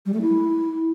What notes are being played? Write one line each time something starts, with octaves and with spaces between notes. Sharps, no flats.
G3
A3
E4